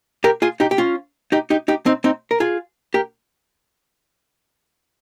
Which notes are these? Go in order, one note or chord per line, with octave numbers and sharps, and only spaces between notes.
G4 A#4
F4 G#4
D#4 G4
G4
C#4 F4
D#4 G4
D#4 G4
D#4 G4
C4 D#4
C4 D#4
A#4
F4 G#4
G4 A#4